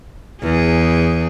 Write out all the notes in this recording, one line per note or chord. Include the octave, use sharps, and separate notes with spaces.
E2 G#4